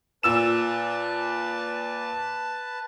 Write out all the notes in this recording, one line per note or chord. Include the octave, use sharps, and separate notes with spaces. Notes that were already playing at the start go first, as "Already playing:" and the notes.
A#2 B4 A5 E6 E7